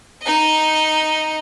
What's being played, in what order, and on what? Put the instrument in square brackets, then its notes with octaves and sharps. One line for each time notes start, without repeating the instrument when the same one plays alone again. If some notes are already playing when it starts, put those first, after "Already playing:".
[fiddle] D#4 D#5